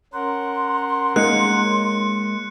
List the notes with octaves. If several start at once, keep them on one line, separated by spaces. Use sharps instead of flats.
C#4 A#4 F#5 C6
G#3 A#3 D#4 F#6 C#7